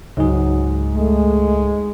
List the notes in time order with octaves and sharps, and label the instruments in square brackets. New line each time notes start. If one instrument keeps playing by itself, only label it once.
[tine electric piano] C#2 G#4 [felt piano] G#2 [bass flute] F#3
[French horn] G#3 [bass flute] A3